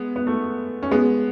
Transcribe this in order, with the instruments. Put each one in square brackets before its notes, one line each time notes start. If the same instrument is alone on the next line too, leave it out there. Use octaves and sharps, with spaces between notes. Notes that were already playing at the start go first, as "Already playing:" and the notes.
Already playing: [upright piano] G#3 B3
B3
A3
C#4
G#3 B3